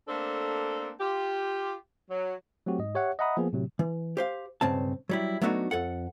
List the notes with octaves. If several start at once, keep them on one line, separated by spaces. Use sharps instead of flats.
A3 A#3 C4 D4 A4
F4 G4
F#3
F#3 A3 C4 F#4 G4
G#2 D#5
G4 C#5 E5 F#5
D#5 E5 F#5 A#5 B5 D#6
F3 A#3 B3 G#4
A2 C3 F#3
E3
G4 C5 F5
B1 G2 C#3 C4 A5
F#3 G3 E4
F#3 A3 B3 D4 D#4 F#4
F2 A4 F#5